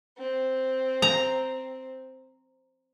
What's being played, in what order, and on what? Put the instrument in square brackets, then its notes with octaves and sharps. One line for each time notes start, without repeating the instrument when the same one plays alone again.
[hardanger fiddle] C4
[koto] A#5